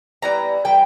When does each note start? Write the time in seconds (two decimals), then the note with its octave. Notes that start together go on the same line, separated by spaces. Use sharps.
0.22 E3 G3 B3 A#5
0.65 E3 G3 G5